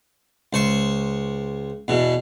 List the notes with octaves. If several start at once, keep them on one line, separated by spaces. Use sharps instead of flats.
C#2 C5 C#6
E2 B2